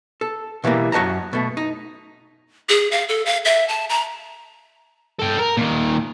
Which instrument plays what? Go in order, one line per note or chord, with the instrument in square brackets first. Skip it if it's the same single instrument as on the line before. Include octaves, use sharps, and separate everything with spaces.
[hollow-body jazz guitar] A4
B2 E3 G3 A3 A#3
F#2 F#4 D#5 A5 A#5
B2 A3
D#4
[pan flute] G#4
F5
A4
F5
E5
A5
A#5
[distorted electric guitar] A4 G5
A#4
A#2 D#3